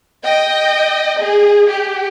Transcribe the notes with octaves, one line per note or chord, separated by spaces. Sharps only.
D#5 G5
G#4
G4